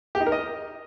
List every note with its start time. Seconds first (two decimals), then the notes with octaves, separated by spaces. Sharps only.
0.15 G4
0.21 D#4
0.26 A#4
0.32 D#5